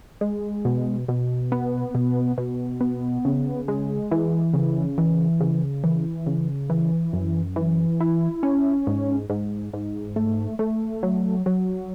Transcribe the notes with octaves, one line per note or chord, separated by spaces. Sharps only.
G#3
B2
B2
B3
B2
B2
B3
C#3
G#3
E3
C#3
E3
C#3
E3
C#3
E3
F#2
E3
E4
C#4
G#2
G#2
G#2
A3
A3
F#3
F#3